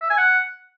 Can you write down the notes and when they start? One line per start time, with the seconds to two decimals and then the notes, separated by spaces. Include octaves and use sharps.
0.02 E5
0.10 G#5
0.18 F#5